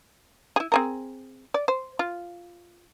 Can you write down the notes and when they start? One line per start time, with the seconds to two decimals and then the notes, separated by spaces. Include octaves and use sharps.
0.56 E4 G#4
0.72 C4 G#4 A#4
1.54 D5
1.68 C5
1.99 F4